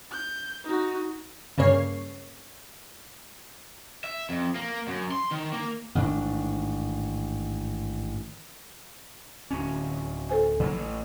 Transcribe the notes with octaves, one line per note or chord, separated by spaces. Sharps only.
G6
D#4 F#4
G2 C#3 A#3 C#5 C7
E5
F2
A#3
F#2
C6
D#3
A#3
A1 G#2 D#3 D4
D1 C#4
A4 C5 G#5
C#3 F#3 A#3
A1